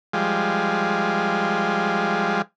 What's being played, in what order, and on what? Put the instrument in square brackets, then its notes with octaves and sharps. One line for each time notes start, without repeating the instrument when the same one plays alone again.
[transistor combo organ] F3 G3 G#3